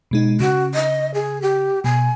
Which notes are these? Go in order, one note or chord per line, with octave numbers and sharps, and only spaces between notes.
B2 G#3 D#4
C#3 F#4
D#5
G#4
G4
B2 G#5